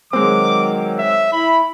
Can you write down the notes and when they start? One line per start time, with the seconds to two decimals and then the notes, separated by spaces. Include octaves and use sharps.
0.13 D#3 F#3 G#3 C4 D6
0.99 E5
1.33 E4 B5